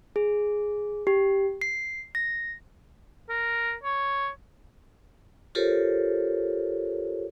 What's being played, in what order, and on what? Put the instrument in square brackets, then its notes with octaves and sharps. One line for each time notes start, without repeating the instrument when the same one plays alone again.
[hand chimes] G#4
G4
C7
A#6
[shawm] A#4
C#5
[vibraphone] F4 G4 A4 A#4 C5 C#5